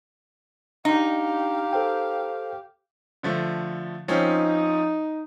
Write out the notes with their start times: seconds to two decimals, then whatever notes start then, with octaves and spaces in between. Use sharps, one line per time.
0.85 D4 D#4 G4 F5
1.73 A4 C5 G5
3.23 D3 F3 A3
4.08 F3 C4 C#4 D#4